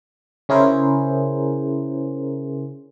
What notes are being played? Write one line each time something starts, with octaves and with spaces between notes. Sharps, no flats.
C#3 C#4 E4 G#4 A#4 C5